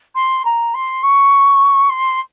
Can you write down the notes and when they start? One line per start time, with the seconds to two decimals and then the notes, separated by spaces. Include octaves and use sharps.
0.15 C6
0.45 A#5
0.74 C6
1.03 C#6
1.89 C6